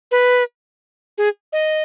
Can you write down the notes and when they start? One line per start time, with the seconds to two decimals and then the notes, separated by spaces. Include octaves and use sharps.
0.11 B4
1.18 G#4
1.53 D#5